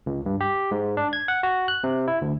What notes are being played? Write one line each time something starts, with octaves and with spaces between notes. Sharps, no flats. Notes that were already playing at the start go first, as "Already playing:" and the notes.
C#2
G2
G4
G#2
D4
G#6
F#5
F#4
F#6
C3
E4
D2